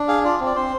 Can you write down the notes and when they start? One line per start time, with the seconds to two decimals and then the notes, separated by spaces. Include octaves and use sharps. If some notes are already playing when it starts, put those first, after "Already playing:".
Already playing: D4
0.08 G#4 F5
0.24 F4 D5
0.40 C4
0.46 D5
0.56 C4 C5